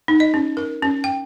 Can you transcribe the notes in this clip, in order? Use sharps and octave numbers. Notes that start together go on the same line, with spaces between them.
D#4
D#5
C#4
A#4
C#4
G5